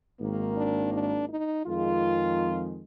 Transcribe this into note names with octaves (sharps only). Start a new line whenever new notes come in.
G#1 G#2 D#3 A#3
D4
D4
D#4
F2 D#3 G#3 F4